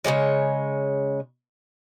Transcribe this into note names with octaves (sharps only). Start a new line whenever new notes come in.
C#3 F#3 G#3 C#5